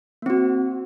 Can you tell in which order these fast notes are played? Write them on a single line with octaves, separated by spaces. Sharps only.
A#3 C4 F#4